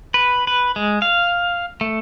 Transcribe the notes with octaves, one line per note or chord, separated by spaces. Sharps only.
B4
B4
G#3
F5
A3